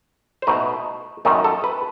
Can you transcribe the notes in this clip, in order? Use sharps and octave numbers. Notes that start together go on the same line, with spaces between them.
C5
B2 A3 D#4 B4
F#2 D#3 A3 D#4
A4
B4